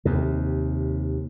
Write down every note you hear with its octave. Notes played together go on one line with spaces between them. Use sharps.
D#2 C3